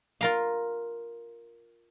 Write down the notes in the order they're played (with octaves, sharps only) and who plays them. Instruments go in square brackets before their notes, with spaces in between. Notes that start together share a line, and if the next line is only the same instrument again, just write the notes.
[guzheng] F4 A#4 F5